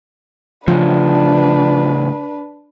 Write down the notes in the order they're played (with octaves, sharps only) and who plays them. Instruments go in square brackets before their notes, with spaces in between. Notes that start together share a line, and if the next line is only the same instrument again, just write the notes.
[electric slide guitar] A2 C#3 [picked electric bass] F3 [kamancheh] D4 B4